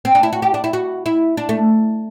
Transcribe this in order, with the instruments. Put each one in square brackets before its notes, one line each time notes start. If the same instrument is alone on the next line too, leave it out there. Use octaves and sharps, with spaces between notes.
[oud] C4
D4
E4
F#4
G4
D4
E4
F#4
E4
D4
A3